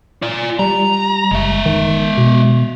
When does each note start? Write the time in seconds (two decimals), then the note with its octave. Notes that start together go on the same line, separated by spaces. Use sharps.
0.22 F4 D5
0.59 G3 A#5
1.31 F#1 G#3 E5
1.66 D#3
2.18 B2